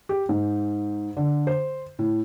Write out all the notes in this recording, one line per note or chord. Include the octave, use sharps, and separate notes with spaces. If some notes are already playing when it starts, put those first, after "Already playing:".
G4
G#2
D3
C5
A2